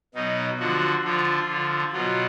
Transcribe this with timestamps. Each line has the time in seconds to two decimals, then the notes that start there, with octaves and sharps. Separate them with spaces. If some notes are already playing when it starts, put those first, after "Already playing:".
0.15 B2 F#3 D#4
0.60 D3 F3 F#4
1.04 D3 F3 F4
1.48 D3 F3
1.93 B2 F#3 F4